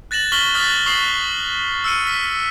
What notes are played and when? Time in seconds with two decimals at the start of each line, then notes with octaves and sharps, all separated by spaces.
0.11 F#6 A6 A#6 E7 F#7
0.32 C#6 F6 B6 F#7 G7
0.55 D#6 F6 F#6 A6 B6
0.86 C#6 D#6 C7 E7 F#7
1.84 E6 F6 C#7 D#7
2.07 B6